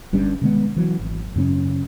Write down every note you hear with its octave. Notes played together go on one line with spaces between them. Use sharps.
G1 G2 G3 C#4
C3 D#3 G#3 B3
E3 F#3
G#1
F#2 C#3 C4 C#4